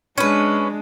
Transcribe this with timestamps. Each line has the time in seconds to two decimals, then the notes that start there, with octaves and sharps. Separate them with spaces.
0.18 G#3 C#4 D4 B4